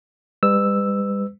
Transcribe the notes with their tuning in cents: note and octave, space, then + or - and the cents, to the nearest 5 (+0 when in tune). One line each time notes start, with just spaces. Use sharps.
G3 +40 B4 +25 E6 +0